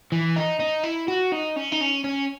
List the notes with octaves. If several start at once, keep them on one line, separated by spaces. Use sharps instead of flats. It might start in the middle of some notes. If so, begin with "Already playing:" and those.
E3
D#4
D#4
E4
F#4
D#4
C#4
D#4
C#4
C#4